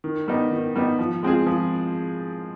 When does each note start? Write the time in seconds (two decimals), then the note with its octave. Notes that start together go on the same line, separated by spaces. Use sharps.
0.04 D#3
0.28 G3 B3 D#4
0.51 D#3
0.76 G3 B3 D#4
0.99 F3
1.23 G#3 C4 F4 G#4
1.47 F3